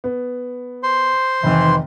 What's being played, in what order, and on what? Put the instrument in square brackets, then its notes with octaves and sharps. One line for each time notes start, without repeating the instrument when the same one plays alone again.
[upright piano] B3
[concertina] C5 C6
[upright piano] F1 D#3 [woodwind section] E3